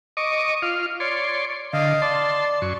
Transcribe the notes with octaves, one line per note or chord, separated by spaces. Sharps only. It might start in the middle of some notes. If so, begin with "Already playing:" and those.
D#5 C#6 D6
F4 F5
C#5 D5 C6
D3 D#5 F5
D5 A5 C6
F#2 C#6